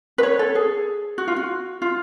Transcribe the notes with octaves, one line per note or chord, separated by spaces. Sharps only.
B4
C#5
A4
G#4
F#4
F4
F#4
F4